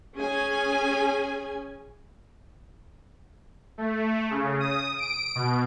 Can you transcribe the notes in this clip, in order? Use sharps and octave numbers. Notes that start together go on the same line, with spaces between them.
C#4 G#4 G#5
A3
C#3
D#6
D7
B2